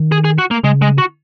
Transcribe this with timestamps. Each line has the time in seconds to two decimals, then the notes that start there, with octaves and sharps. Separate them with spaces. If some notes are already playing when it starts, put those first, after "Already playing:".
Already playing: D#3
0.12 G#4
0.24 G#4
0.38 F#4
0.51 A#3
0.63 C#3 G#3
0.82 G#3
0.98 F#4